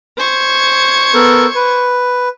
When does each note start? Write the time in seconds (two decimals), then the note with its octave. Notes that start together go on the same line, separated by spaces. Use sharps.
0.17 C5 C#6 G#6
1.14 B3 A4 A#4
1.55 B4